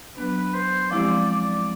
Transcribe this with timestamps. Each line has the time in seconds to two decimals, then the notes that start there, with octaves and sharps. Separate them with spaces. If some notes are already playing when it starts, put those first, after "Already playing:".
0.17 F#3 B3 D4 B4
0.54 C5
0.90 F3 G#3 C4 E4 G4 D5
1.28 D5